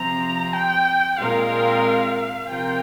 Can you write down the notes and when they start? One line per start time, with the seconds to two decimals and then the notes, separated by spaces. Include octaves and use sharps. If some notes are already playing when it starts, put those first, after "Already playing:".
Already playing: C3 F3 C4 A#5
0.53 G5
1.18 A#2 G#3 C4 F4 A#4 F5
2.48 C3 F3 C4 F4 A#4 G5